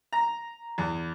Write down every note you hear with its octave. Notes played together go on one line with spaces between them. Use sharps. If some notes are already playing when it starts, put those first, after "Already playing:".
A#5
E2